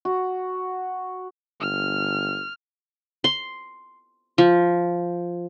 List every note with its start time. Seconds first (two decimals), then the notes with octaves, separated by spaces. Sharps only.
0.05 F#4
1.61 G1 F6
3.24 C6
4.38 F3